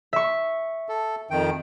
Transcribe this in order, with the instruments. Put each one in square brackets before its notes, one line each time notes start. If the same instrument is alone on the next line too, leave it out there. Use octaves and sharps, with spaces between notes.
[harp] E5 C#6
[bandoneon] A4
F2 D#3 G5